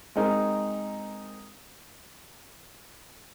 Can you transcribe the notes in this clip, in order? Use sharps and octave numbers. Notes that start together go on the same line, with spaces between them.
G#3 C4 D#4 A#4